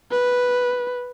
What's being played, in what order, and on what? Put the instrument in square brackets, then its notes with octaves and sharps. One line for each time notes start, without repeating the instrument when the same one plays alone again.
[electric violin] B4